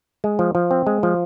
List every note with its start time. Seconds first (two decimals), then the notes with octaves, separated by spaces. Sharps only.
0.24 G#3
0.39 F3
0.55 F3
0.71 C4
0.87 G#3
1.03 F3